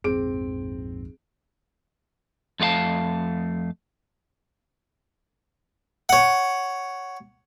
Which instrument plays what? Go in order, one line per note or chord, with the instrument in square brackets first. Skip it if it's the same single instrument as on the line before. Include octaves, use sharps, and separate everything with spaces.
[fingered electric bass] A#1 F2 G#2 [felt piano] C4 D7 [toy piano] G#4
[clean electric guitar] F2 A3 F4 F5 A5
[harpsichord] C#5 F#5